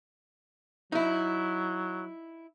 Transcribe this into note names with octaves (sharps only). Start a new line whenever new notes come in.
F#3 D#4 E4